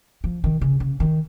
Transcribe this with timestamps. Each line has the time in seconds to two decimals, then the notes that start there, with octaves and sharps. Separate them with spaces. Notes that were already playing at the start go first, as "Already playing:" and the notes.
0.24 F3
0.44 D#3
0.61 C#3
0.80 C#3
1.00 D#3